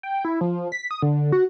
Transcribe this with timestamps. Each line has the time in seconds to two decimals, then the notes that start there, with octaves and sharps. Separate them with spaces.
0.03 G5
0.25 E4
0.41 F3
0.72 B6
0.91 D#6
1.02 D3
1.32 F#4